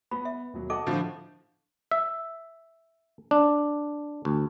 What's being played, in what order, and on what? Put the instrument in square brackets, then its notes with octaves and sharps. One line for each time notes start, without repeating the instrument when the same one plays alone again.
[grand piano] B3 [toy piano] F4 B5
[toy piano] E5
[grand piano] D#2 B2 F#3
[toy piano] D#4 A4 D6 [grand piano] D#5 F#5 A5
[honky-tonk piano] A2 D3 F3
[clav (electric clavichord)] E5
D4
D2